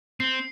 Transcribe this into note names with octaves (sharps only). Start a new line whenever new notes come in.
C4 C7